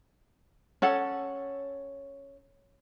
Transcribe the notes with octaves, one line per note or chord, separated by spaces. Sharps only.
C#4 A4 F#5